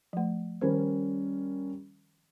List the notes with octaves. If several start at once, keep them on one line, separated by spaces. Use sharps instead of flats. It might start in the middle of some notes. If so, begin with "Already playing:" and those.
F3 A3
D#3 G3 C#4 A#4 C5